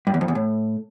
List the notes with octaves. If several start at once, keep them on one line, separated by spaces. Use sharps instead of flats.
G2
E2
F2
E2
A2